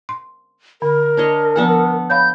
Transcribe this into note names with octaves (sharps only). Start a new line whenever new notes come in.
C6
D3 A#4
D4 C#5 D#5
F3 B3 A4 F#5 G#5
C#5 F5 B5 G6